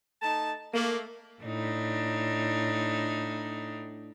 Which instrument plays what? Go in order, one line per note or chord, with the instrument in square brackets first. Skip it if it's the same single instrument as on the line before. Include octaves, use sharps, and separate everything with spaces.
[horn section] A3 D#4 A5
A3 A#3
[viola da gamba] A2 D4 D#4